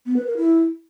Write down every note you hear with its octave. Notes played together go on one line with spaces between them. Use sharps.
B3
B4
A#4
E4